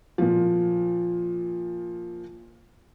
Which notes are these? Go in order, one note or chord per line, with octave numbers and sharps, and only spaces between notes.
A#2 F3